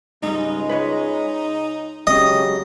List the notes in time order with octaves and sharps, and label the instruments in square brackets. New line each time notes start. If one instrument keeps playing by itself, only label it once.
[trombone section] C#2 G#3 [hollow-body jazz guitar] G#2 G3 [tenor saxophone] D#4
[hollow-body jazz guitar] B4 C#5 D#5
[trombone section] C#3 F#3 G4 [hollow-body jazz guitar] G#3 C#4 [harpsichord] D#5